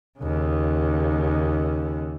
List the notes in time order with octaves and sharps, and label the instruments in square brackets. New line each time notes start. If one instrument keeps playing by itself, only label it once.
[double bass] D#2 C#3